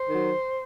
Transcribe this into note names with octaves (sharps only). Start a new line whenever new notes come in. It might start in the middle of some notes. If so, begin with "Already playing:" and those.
Already playing: C5
D#3 F#3